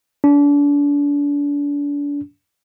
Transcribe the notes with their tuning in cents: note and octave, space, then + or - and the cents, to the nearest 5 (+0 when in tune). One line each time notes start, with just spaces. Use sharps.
D4 -35